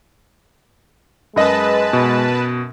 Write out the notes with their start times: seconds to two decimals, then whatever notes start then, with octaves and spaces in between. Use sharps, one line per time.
1.36 F#2 G#3 B4 D#5 A5
1.93 B2